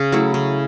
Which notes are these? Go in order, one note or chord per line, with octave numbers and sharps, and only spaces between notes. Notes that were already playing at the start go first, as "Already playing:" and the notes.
Already playing: C#3
F#3 A3 E4
C#3